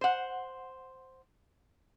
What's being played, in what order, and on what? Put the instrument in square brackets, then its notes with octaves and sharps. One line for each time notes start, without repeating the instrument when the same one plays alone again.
[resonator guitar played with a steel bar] C5 F#5